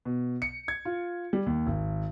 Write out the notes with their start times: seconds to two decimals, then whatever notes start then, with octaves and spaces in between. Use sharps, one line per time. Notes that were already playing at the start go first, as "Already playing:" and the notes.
0.05 B2
0.42 C#7
0.68 G#6
0.85 F4
1.33 G3
1.46 D#2
1.66 G#1